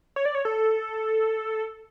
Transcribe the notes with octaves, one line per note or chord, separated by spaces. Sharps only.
C#5
D5
C#5
A4